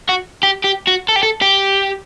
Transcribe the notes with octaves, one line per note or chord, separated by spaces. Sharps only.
F#4
G4
G4
F#4
A4
G4
A4
G4